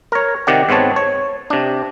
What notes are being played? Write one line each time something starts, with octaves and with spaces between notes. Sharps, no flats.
A#4 C#5
C3 D#3 G4 D5 F#5
G#2 B3 C4 C#5 A5
C#5
C3 D4